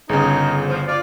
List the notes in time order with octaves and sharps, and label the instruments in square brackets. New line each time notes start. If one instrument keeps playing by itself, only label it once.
[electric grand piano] G1 C#3 [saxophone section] D#4 G#4
[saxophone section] F3
F4 D5